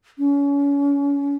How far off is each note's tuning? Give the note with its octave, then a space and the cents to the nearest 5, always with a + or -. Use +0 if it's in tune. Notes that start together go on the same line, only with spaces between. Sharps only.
C#4 +30